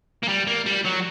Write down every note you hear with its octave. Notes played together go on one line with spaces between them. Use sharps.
A#3
G3
A#3
G3
F#3